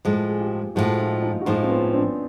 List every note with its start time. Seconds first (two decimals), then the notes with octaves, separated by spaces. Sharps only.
0.05 A2 F3 G#3
0.29 G#4
0.41 F4 G4
0.75 A2 F3 G#3 E4 F#4
0.98 D#4 F4
1.22 D#4 F4
1.41 F#4
1.45 A2 F3 G#3 D#4 F4
1.64 C4
1.70 B3 C#4
1.93 C4 D4